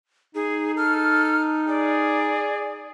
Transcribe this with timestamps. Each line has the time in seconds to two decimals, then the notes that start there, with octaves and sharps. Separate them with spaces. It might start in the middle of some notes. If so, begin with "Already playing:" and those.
0.35 D#4 G#4
0.77 A4 F6
1.68 G#4 D5